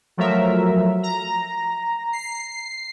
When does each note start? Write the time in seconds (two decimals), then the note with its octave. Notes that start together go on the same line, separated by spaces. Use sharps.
0.17 F3 F#3 A3 A#4 E5
1.03 A#5
2.13 C7